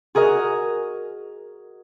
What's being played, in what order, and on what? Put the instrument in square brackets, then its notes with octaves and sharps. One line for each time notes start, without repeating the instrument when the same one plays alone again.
[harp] F#4 G#4 A#4 D#5